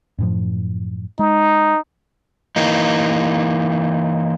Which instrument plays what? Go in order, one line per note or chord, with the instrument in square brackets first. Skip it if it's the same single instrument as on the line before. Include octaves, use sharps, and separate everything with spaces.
[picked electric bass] F#2 A2 F3
[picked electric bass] G#3 [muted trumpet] D#4
[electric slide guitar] E3 A#3 D#4